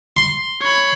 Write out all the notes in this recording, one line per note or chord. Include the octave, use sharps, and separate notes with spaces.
C6
C#5 B5